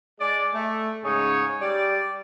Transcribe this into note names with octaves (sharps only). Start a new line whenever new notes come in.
G#3 D5
A3
G#2 C#3 D#4 G#4 C#5
G3 D5